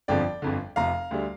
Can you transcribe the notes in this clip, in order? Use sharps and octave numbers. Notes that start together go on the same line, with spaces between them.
G1 F2 D3 F3 D5 G5
G1 F2 D3
F1 F2 C3 F5 A#5
D2 D3 G3